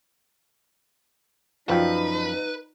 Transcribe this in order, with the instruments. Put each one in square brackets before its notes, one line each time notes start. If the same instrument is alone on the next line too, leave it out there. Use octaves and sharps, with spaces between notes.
[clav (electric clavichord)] F#2 F3 [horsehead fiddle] D#4 [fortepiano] F4 D5 G5 [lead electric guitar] B4